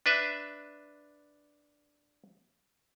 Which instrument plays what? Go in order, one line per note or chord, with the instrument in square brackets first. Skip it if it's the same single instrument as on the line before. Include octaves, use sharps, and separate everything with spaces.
[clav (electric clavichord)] D4 B4 E5